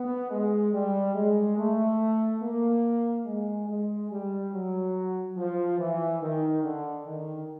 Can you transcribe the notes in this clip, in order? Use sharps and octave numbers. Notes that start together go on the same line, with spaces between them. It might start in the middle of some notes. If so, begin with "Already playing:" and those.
Already playing: B3
G#3
G3
G#3
A3
A#3
G#3
G#3
G3
F#3
F3
E3
D#3
D3
D#3